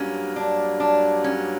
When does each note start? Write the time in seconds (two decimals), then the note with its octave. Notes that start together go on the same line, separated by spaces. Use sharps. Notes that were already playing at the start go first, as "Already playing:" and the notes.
Already playing: G2 F#3 A#3 C#4
0.36 D4
0.80 D4
1.24 C#4